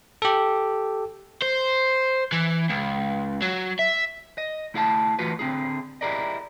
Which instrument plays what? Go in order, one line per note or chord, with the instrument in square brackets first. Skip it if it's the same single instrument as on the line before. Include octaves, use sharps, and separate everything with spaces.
[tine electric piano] G4 A4
[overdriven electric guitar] C5
E3
C#2
F#3
E5
[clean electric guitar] D#5
A3 E4 G#4 F5 F#5 A5
E3 A3 F4 F#4 B4
D3 C4 D#4 G#4
E4 G4 G#4 A#4 D5 D#5